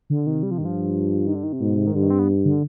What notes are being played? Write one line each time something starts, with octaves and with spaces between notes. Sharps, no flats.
D3
C3 D#3
G3
F3
G2 D#3
F3
D#3
D3
D#3
C3
G#2 B2
C3
D#3
G2 D3
D#3
C4
B3
D3